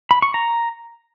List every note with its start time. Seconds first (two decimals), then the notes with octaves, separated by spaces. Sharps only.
0.11 B5
0.22 C#6
0.34 A#5